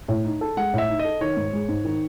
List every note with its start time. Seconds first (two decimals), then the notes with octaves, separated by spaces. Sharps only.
0.08 A2
0.25 D#4
0.41 A4
0.57 G#3 F#5
0.73 A2 E5
0.89 D#4
0.99 D#5
1.04 A4
1.21 D#3 C#5
1.37 G#2
1.53 G#3
1.69 G#2
1.85 D#3